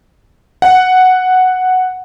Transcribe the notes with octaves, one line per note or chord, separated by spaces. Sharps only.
F#5